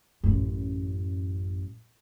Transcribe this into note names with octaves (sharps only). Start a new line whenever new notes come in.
A1 F#2